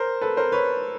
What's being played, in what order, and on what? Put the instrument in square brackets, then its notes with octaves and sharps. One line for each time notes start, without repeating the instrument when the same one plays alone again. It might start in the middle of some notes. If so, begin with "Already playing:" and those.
Already playing: [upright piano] A#4 C5
A4 B4
A#4 C5
B4 C#5